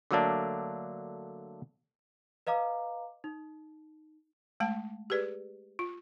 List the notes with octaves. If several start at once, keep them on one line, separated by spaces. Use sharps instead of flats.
D3 F#3 A3 A#3 D4
B4 D#5 F5 A#5 D6
D#4
G#3 A3 F5 A5
G4 G#4 B4 D5
F4